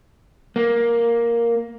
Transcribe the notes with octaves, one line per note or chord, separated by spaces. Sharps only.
A#3